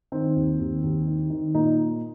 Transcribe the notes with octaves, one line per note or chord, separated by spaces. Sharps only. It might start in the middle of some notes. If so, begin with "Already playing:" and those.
D#3 C4
D#2
D#2
D#2
D#3
D#3
A#2 D#4